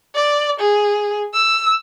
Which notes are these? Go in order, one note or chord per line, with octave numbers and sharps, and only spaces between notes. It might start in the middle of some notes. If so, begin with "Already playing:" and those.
D5
G#4
E6